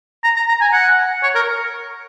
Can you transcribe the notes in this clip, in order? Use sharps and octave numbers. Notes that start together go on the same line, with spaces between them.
A#5
A#5
A#5
G#5
F#5
C#5
A#4